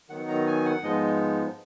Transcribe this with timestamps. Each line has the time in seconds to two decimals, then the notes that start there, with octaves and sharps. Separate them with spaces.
0.09 D#3 F#3 B3 D#4 F#5
0.28 A#5
0.47 G#5
0.65 F#5
0.83 G#2 F3 G#3 B3 D#4 D#5